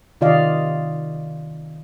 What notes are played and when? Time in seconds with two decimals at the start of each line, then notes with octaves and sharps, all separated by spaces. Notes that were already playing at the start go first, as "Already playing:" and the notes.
0.21 C3 D#3 F4 D5 D#5 F5